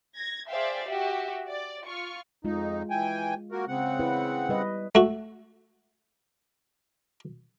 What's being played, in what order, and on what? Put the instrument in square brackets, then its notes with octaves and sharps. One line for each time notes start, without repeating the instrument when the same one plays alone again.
[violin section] G#6 A#6
G#4 C5 D5 E5 F5 G5
F#4 G4 E5
D5
F4 C#6 F6
[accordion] F2 D#4 [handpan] G#3 F4
[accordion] E3 G5 G#5
A#3 F#4 A#4
C#3 C4 F#5
[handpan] E4 B4
G3 B4 D#5
[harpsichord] A3 F#4